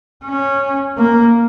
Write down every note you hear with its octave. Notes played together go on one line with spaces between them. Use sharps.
C#4
A#3